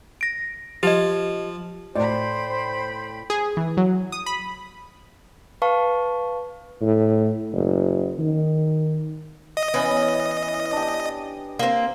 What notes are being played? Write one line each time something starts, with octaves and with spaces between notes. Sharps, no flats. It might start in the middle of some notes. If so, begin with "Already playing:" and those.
A#6 D7
F3 G4 D#5
A2 C5 D5 G5 B5
G#4
E3
F#3
D#6
B5
B4 F5 A5 C#6
A2
F#1
D#3
D#5
E3 B3 C#4
D4 G4
A#3 C4